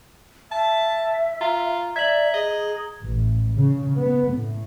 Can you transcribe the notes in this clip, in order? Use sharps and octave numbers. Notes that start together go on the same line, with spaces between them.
E5 A5
F4 A#5
D5 E5 G#6 F#7
G#4 D#5
A1
C#3
B3
A2